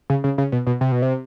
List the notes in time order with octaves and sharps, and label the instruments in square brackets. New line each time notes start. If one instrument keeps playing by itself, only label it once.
[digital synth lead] C#3
C#3
C#3
B2
B2
C3
B2
C3